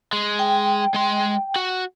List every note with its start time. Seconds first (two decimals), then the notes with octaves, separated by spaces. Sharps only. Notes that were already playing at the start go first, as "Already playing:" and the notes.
0.13 G#3
0.39 G5
0.94 G#3 C6
1.56 F#4